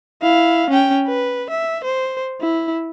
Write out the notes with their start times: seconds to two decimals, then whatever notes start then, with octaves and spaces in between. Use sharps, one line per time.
0.22 E4 F5
0.70 C#4 G5
1.07 B4
1.50 E5
1.84 C5
2.41 E4